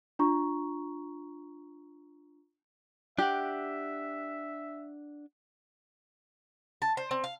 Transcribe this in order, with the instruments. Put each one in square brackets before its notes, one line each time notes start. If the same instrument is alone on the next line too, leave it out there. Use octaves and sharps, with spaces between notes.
[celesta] D4 F4 A#5 C#6
[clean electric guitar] D4 F#5 [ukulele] G4 [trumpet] E5
[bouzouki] A5
C5
C4
F5